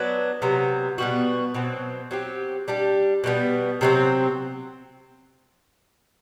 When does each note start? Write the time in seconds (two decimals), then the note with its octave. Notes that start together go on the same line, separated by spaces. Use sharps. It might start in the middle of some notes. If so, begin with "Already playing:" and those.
Already playing: F#3 B3 D4
0.42 C3 F#3 B3
0.98 B2 G3 B3 F#4
1.54 B2 F#3 C4
2.11 F#3 C4 G4
2.68 G3 D4 G4
3.24 B2 G3 B3
3.81 C3 F#3 A3 C4